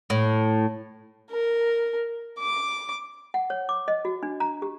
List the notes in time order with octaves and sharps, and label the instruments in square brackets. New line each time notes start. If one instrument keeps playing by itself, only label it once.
[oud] A2
[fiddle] A#4
D6
[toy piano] F#5
C#5
D6
D#5
F#4
D4
A#5
G4